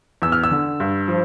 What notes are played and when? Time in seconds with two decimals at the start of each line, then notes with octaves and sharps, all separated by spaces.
0.22 E2 E6
0.32 F6
0.44 E6
0.51 D3
0.80 G2
1.08 F3